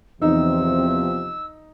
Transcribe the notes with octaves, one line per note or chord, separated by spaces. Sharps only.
E2 C3 F3 C4 D#4 E6